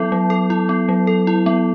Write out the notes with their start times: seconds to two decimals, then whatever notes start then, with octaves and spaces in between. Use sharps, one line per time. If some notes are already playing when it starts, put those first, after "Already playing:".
Already playing: F#3 B3 E4 A4
0.12 F#3
0.30 A4
0.50 E4
0.69 B3
0.89 F#3
1.07 A4
1.27 E4
1.46 B3